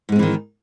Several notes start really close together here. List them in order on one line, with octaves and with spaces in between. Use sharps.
G#2 G#3 C4 E3 D#3